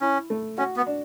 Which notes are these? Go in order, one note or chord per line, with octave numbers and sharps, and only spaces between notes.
C#4 E4
A3
C#4 F#4
B3
D4